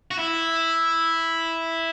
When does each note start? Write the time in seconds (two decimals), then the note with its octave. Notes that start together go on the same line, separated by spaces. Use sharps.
0.11 F#4
0.18 E4